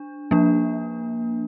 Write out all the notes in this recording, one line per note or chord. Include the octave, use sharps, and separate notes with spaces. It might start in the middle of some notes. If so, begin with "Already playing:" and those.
Already playing: D4
F3 A#3 D4